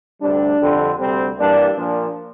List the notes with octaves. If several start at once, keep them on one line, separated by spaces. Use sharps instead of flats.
D2 C3 G3 D4
F2 D3 G3 C4
D2 C3 G3 C4
G2 E3 G3 A#3 D4
A#2 F3 A#3 D4